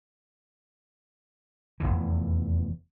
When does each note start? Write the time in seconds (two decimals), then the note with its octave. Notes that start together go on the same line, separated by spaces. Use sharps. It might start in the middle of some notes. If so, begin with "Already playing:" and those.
1.80 F1 B1 E2 E3